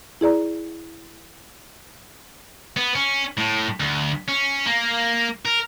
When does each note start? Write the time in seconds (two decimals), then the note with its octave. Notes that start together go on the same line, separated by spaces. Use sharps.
0.21 E4 G#4 D5 A#5
2.76 B3
2.95 C#4
3.38 A2
3.80 D2
4.28 C#4
4.66 A#3
5.45 A#4